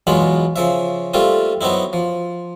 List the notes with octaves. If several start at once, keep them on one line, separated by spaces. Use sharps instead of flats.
E2 B2 F#3 G#3 F4 B5
C#3 F3 E5
G3 A3 A#3 C4 F4 G4
F#3 B3 C4 D#4 E4
F3